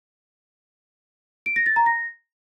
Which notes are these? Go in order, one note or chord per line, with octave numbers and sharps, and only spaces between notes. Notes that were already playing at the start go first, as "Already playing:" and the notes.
D7
A#6
A6
A#5
A#6